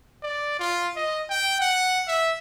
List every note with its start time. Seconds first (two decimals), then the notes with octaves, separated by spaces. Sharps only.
0.23 D5
0.59 F4
0.96 D#5
1.30 G5
1.61 F#5
2.07 E5